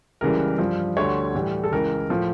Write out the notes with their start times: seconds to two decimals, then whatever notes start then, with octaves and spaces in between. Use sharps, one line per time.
0.21 C#2 C#3 E3 G3 A#4
0.58 G2 F3
0.97 D2 D3 G3 C#5
1.34 A2 E3 G3
1.63 A4
1.72 C#2 C#3 E3 A#4
2.10 A2 F3